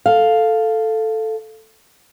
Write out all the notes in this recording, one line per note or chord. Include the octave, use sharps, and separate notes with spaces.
A4 F5